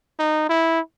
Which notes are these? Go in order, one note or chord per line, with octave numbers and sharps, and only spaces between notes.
D#4
E4